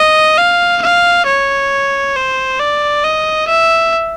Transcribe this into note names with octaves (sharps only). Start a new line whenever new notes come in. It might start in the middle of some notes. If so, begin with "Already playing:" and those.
Already playing: D#5
F5
F5
C#5
C5
D5
D#5
E5